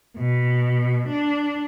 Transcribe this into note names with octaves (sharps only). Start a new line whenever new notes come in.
B2
D4